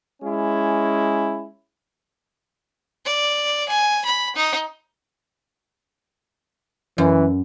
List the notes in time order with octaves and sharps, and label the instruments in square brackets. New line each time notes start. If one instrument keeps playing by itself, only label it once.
[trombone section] G#3 C#4 E4
[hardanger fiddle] D5
G#5
B5
D#4
[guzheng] F#2 [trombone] E3